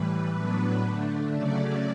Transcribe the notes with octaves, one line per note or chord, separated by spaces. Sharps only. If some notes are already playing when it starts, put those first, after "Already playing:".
Already playing: A2 E3 G3 B4
A2 F#3 B3 D4
D3 A3 D4
C#3 F#3 A3 C#4 D5